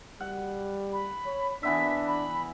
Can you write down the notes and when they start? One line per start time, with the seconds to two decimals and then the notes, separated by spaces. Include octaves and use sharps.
0.21 G3 F#5
0.92 B5
1.26 C#5
1.63 E3 B3 D4 E5 B6
2.07 B5